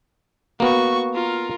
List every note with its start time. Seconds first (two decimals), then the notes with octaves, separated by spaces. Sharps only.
0.60 A#3 B3 F#4 C#6
1.14 F4 A#4